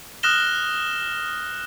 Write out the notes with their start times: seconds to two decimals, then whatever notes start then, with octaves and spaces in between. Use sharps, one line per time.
0.23 D#6 F6 F#6 A#6 E7 G7